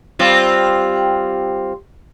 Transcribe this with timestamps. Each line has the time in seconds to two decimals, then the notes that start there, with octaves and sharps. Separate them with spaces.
0.19 G3 C4 F4